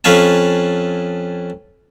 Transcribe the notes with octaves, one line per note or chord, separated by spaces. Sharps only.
F2 C#4 B4 F5 G#5 A5